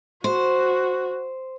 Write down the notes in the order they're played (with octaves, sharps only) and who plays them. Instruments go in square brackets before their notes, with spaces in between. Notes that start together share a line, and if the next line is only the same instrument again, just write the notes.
[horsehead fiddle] F#4 [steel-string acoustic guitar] C5